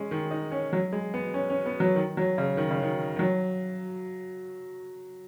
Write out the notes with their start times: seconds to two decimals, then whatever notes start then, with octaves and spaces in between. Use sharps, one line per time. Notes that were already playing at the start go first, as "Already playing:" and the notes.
Already playing: G#3 C#4
0.11 D#3
0.31 D#4
0.51 C#4
0.73 F#3
0.92 G#3
1.14 B3
1.34 C#4
1.50 C#4
1.66 B3
1.80 F#3
1.95 D#3
2.17 F#3
2.38 C#3
2.57 D#3
2.71 C#3
2.82 D#3
3.16 D#3
3.19 F#3